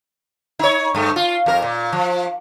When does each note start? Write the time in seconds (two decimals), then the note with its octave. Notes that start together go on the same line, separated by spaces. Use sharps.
0.59 D#4 C#5
0.95 G2 A3
1.16 F4
1.46 F2 A#4
1.62 A#2
1.92 F3